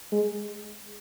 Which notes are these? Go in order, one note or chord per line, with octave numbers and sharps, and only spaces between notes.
G#3